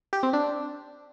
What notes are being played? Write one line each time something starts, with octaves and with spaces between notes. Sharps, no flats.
G4
C4
D4